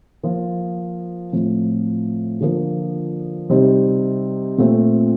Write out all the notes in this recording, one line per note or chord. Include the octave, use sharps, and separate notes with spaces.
F3 A#3 F4
A2 F3 C4
D3 F3 A#3
C3 G3 C4 D#4
A#2 A3 C4